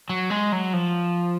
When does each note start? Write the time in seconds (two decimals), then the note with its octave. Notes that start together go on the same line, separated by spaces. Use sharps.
0.09 F#3
0.30 G#3
0.52 F#3
0.73 F3